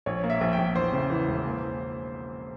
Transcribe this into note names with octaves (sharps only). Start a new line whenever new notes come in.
A#1 C#5
A#3
E5
A#1
G5
A#1
E2 C5
C#3
E3
E1
A#3